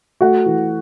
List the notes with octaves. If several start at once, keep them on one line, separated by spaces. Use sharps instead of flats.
A3 F#4 F#5
E3